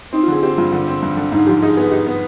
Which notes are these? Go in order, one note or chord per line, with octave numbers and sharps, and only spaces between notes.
C4 D#4
F4
D3 G#4
C4 G4
G2 F4
D3
C4
G2
D3
G#2 D#4
F3 G4
D#4 G#4
B3 G#4
D#4 G4
B3